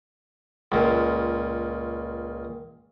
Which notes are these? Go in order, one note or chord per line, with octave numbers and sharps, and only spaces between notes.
C#2 A#2